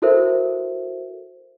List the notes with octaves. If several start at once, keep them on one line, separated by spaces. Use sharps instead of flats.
E4 F#4 A4 A#4 C5 E5